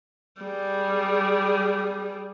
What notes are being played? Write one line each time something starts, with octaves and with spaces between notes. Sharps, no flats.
G3 G#4